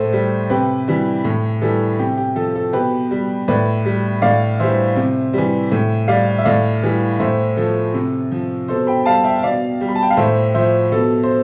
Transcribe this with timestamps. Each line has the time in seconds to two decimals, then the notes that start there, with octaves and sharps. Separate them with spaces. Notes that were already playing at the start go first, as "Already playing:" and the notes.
Already playing: A2 A4 C5
0.13 G3
0.50 C3 G4 B4
0.88 E3 G3
1.25 A2
1.62 E3 G3 A4
1.99 C3 G4
2.17 G4
2.36 F3 A4
2.55 A4
2.73 B2 G4 B4
3.11 G3
3.48 A2 B4 D5
3.85 G3
4.22 A2 D5 F5
4.59 E3 G3 C5 E5
4.96 C3
5.34 E3 G3
5.72 A2
6.08 G3 D5 F5
6.38 E5
6.45 A2 D5 F5
6.83 E3 G3
7.20 A2 C5 E5
7.57 F3 A4
7.94 C3
8.32 F3
8.68 B2 A4 C5
8.87 G5 B5
9.06 G3 F5 A5
9.24 E5 G5
9.43 B2 D5 F5
9.81 G3
9.88 B5
9.95 A5
10.03 G5
10.11 F5
10.17 A2 C5 E5
10.54 F3 C5 E5
10.92 B2 A4
11.23 C5